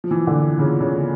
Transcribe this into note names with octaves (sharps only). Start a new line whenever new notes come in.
F3
E3
D3
C#3
C#3